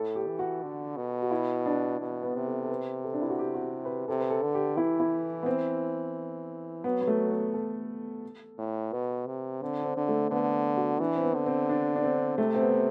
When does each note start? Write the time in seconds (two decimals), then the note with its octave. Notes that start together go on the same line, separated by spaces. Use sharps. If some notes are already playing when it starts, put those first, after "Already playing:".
Already playing: A2 A4
0.15 G4
0.28 E3
0.39 F#4
0.63 D3
0.96 B2
1.22 F#4
1.31 E4
1.66 D4
2.00 B2
2.23 B3
2.35 C3
2.47 A4
2.63 A4
2.70 B4
3.04 A4
3.14 D4
3.22 E4
3.30 F#4
3.39 G4
3.54 F#4
3.62 G4
3.85 B4
4.08 C3 A4
4.20 B4
4.30 A4
4.42 D3
4.54 G4
4.77 E3 E4
5.00 E4
5.43 B3
5.46 C4
6.84 F#3 B3
7.01 B3
7.07 A3
7.31 B3
7.54 A4
8.58 A2
8.92 B2 B4
9.26 C3
9.62 D3 C4
9.80 D4
9.84 C4
9.97 D3
10.08 A3
10.30 D3 B3
10.77 F#4
10.99 E3 D4
11.16 C4
11.22 B3
11.35 D3
11.46 C4
11.70 D4
11.96 D4
12.03 C4
12.38 C3 A3
12.55 C4
12.61 B3